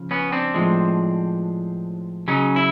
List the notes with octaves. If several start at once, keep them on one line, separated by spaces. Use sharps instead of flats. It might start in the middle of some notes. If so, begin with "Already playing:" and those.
Already playing: C#3 F3
B3 C#4
C4 D4
A2 F3 G#3
C#3 F#3 C#4 D#4
E4